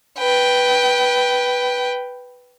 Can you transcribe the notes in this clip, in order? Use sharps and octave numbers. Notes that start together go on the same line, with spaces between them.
B4 G5